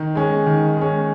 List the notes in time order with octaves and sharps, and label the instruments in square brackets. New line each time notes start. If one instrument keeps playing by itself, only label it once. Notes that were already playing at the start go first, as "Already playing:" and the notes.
Already playing: [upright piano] D#3
G#3 C#4
D#3
G#3 C#4